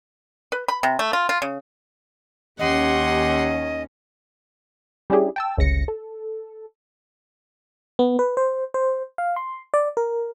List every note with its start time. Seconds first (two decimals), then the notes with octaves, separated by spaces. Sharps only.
0.52 B4
0.68 B5
0.83 C3
0.99 A3
1.13 F4
1.29 F4
1.42 C#3
2.59 D#2 C#4 G4 D#5 F#5 C6
5.10 G3 C#4 D4 E4 G4 G#4
5.36 G5 A5 E6
5.58 G1 C#2 C#3 A#6 C#7
5.88 A4
7.99 B3
8.19 B4
8.37 C5
8.74 C5
9.18 F5
9.36 C6
9.74 D5
9.97 A#4